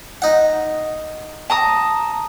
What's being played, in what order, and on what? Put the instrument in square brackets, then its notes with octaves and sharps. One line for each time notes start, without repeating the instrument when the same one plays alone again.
[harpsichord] D#4 F#5
[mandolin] A5 A#5 D#6